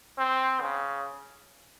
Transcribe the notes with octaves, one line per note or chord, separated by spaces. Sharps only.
C4
C#3